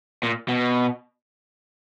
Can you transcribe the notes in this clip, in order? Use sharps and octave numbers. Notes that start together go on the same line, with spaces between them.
A#2
B2